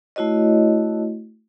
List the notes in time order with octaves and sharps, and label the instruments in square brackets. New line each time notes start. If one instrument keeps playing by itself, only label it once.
[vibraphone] A3 E4 F#4 C#5 D#5